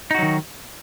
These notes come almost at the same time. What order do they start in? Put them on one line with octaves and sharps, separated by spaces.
D#4 F#4 F#3 D#3